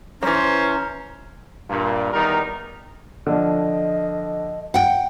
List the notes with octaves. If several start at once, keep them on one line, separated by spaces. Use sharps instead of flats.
E3 F#3 C#4 C5 A#5
G2 A#2
E2 D#3 G3 D#4 A#4
D3 F3 D#5
F#5 G5